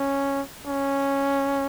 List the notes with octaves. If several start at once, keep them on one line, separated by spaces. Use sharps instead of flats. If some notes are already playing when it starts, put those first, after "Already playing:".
Already playing: C#4
C#4